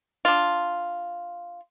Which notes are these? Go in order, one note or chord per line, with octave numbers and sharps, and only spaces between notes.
D4 F4